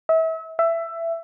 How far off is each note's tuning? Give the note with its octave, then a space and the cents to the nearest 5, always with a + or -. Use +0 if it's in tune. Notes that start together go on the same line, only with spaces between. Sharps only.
E5 -35
E5 +15